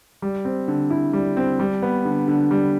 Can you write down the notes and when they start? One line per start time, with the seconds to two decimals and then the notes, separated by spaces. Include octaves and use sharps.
0.22 G3
0.45 C4
0.68 D3
0.90 E4
1.13 G3
1.37 C4
1.60 G3
1.82 B3
2.05 D3
2.28 D3
2.51 G3